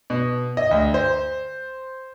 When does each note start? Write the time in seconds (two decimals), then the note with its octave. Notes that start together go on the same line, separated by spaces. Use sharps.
0.10 B2
0.57 D#5
0.71 D2
0.94 C5